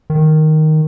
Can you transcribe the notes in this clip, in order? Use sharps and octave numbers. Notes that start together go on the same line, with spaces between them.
D#3